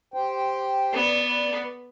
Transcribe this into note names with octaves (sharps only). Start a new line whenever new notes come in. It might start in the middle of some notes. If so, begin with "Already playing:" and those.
G4 C5 G5
B3 B4 D5